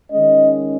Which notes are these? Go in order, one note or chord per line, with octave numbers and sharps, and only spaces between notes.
D#3 G#3 C#4 D#5